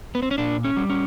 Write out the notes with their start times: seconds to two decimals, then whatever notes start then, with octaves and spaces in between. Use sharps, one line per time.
0.15 B3
0.22 C4
0.31 C#4
0.38 A#2 D4
0.64 C#4
0.77 G3
0.90 C#4